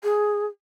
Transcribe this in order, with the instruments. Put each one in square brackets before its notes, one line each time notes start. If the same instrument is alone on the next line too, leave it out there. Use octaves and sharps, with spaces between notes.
[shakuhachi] G#4